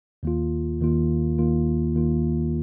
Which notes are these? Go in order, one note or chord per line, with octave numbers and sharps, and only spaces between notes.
D#2 D#3 A#3 F4
D#2 D#3 A#3 F4
D#2 D#3 A#3 F4
D#2 D#3 A#3 F4